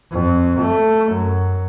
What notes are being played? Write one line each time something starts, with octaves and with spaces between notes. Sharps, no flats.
F2
A3
F#2